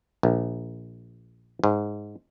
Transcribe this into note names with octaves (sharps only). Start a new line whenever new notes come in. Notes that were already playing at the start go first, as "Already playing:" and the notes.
A#1
G#2